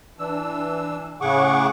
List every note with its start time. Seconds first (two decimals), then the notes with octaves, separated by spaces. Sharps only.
0.19 E3 D4 E6
1.21 A2 C#3 G#4 F#5 C#6 D6